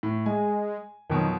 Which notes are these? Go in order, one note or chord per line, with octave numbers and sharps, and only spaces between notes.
A2
G#3 G#5
F2 B2 D#3 F#3